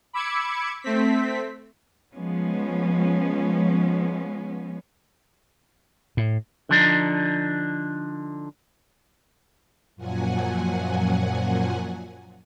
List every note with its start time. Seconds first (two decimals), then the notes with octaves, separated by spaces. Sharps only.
0.13 B5 D6 E6 G#6 C#7
0.82 A3 C4 B6
2.15 F3 G#3 B3 C#4
6.17 A2
6.69 D3 F3 D4 D#4
9.96 F#2 A#2 F3 F#3 F#5 G#5